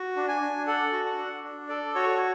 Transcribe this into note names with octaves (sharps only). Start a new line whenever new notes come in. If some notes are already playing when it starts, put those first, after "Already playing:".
Already playing: F#4
D4
G#5
D4
A4 F#5
F#4
F#5
D4
D4
A4 D5
F#4 C#5